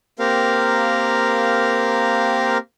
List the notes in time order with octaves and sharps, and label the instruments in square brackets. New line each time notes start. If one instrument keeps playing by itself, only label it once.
[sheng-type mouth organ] A#3 C4 G4 A#4 F5